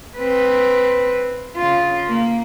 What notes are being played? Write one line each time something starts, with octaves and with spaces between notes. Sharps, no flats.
C4 B4
C#3 F4
A#3